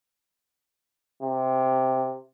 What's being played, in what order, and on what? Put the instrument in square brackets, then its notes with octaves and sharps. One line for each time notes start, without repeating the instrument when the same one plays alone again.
[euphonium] C3